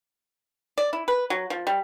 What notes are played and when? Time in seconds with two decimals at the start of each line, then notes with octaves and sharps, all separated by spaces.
0.78 D5
0.93 E4
1.08 B4
1.30 F#3
1.50 F3
1.67 G3